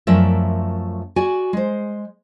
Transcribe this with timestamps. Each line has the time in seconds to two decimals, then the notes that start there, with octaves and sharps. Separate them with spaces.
0.07 F#2 F3 A3 A#4 D5 E5
1.16 F#4 D5 G#5
1.53 G#3 C5